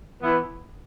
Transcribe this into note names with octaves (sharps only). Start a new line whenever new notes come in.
E3 B3 E4